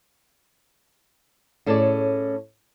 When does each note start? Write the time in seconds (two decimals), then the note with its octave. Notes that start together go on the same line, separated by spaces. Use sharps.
1.66 A2 C#4 G#4 A4 C5 D5